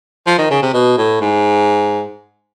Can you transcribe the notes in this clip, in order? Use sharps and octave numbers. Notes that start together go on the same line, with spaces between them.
F3
D#3
C#3
C3
B2
A2
G#2